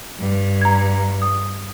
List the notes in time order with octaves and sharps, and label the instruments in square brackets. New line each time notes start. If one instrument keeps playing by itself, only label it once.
[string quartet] G2
[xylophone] A#5 G#6
D#6